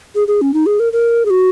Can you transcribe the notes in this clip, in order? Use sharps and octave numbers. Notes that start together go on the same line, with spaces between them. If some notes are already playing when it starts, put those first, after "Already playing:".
G#4
G#4
C#4
D#4
G#4
A#4
A#4
G#4
F#4